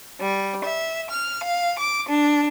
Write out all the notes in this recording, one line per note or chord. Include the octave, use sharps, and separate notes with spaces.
G3
E5
F6
F5
D6
D4